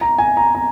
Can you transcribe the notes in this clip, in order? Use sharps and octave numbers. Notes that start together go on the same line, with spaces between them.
A#5
G#5
A#5
A#5